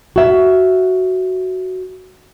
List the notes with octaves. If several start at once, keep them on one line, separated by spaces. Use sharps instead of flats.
F#4 E5